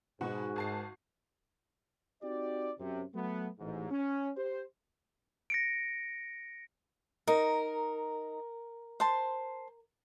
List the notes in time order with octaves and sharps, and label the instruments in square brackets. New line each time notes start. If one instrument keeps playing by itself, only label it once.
[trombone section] G#2 [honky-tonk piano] B2 [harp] F#4
[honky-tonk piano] G#1 A5 C7
[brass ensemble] C4 D#4 F#4 G4 D5
F#2 C3
F#3 A3 B3
A1 G#2
C#4
G4 C5
[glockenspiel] A#6 C#7 D7
[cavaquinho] D#4 [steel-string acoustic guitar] A#4
[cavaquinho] C5 A5 C6